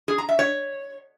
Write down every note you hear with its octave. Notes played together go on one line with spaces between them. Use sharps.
G#4
A#5
E5
C#5